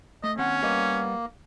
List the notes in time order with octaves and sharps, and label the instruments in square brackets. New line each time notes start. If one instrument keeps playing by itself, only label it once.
[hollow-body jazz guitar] A3 [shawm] D#5
[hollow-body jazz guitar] D#2 C4 F#5 [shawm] C#4
[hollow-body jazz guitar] G3 B3 D#5 [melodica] A#3